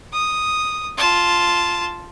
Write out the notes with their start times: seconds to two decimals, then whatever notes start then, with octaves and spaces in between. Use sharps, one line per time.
0.13 D#6
0.98 F4 A5